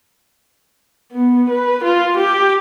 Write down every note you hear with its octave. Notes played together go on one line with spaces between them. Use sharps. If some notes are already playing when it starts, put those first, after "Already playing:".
B3
B4
F4
G4